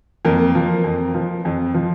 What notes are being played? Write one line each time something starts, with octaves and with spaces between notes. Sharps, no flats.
F2 A#3 A#4
F3
F2
F3
F2
F3